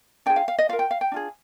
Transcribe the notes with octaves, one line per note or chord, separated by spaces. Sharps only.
D4 F4 G#4 G5
F5
F5
D#5
F4 A#4 F5
G5
F5
G5
D4 F4 G#4